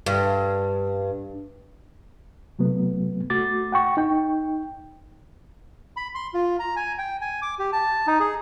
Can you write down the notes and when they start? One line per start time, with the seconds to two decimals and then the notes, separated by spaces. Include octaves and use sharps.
0.06 G2
2.59 C3 F#3 A3 B3
3.30 A3 F#4 D6 A6
3.72 F#5 G5 C#6
3.97 D#4 G5
5.97 B5
6.15 C6
6.34 F4
6.59 A#5
6.76 G#5
6.98 G5
7.21 G#5
7.42 D6
7.59 G4
7.72 A5
8.07 D#4
8.20 G#4